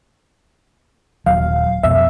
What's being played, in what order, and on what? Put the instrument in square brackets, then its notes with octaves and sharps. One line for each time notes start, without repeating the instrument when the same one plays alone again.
[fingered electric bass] D#1 F#3 [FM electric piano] F5
[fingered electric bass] F2 B2 [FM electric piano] E5